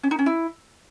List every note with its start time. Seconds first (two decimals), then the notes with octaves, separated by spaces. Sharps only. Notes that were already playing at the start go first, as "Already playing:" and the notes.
0.03 C#4
0.11 D#4
0.19 C#4
0.26 E4